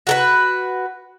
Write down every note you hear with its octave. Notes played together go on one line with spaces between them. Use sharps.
F#4 A4 B4